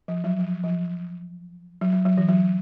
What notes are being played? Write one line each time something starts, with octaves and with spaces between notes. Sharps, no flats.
F3
F#3
F3
F3
F#3
F#3
F#3
E3
F#3